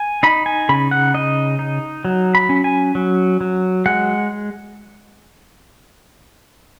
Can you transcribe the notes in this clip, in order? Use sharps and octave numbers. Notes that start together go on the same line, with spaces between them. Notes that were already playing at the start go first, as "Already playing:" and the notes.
Already playing: G#5
D#4 B5
G#5
C#3 B5
F#5
D#4 D#5
D#4
F#3
B5
C#4
G#5
F#3
F#3
G#3 F#5